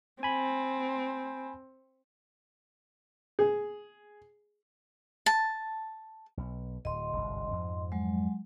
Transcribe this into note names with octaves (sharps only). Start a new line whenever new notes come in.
C4 G#5 B5
G#4
A5
B1
D1 D#5 C6
G1 C2 G#2
F2 G#2 F3
F#3 G#3